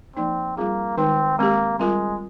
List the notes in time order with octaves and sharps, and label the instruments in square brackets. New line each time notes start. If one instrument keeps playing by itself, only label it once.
[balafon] F3 A#3 D#4 [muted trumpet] C4
[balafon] G3 C4 F4 G#4 [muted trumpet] A#3
[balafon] D#3 G#3 D#4 [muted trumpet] C4
[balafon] G#3 C4 G4 [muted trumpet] A#3
[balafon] G3 C4 F4 A#4 [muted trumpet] G#3